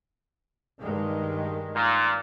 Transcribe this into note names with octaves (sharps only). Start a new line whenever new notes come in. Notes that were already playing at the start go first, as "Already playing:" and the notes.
G2 D#3 G#3
A#2